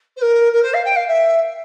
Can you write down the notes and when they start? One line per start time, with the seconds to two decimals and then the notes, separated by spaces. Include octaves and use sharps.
0.16 C5
0.21 A#4
0.52 A#4
0.62 C5
0.73 F5
0.84 G5
0.95 F5
1.07 E5